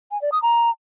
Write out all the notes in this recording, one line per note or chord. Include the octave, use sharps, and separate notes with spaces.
G#5
D5
D#6
A#5